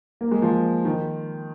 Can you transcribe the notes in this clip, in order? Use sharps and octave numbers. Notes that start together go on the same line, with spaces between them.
A#3
G#3
F3
D#3